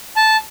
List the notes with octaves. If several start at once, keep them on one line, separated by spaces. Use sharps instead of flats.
A5